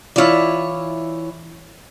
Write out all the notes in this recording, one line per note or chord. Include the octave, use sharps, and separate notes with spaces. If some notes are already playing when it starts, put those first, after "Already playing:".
E3 E4 F4 C#5 D5